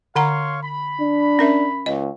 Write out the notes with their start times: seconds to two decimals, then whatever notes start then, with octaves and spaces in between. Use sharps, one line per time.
0.16 D3 C#5 F5 F#5 A#5 C6
0.63 B5
1.01 D4
1.39 C#4 A#4 E5
1.86 C#2 D#5